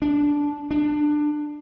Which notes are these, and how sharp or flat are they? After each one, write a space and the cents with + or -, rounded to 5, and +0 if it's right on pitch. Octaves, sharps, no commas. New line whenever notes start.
D4 -10
D4 +20